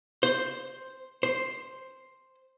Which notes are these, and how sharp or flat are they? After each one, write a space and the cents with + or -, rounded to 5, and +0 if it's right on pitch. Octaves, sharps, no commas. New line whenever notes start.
C5 +0
C5 +0